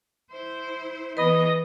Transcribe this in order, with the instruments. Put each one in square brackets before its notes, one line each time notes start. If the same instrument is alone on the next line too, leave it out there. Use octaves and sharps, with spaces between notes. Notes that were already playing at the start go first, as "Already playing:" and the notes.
[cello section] E4 C5
[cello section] E3 B3 G#4 [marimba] B4 B5 [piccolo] D#5